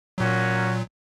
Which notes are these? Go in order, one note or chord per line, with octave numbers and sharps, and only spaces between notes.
A#2 F#3 A#3 C#4 F#4